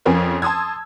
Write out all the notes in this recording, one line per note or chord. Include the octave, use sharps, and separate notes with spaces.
F2 F3 C4 C#4 A#4 G#5
A5 C6 D#6 E6 G#6